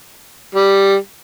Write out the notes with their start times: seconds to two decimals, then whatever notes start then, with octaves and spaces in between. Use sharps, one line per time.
0.55 G3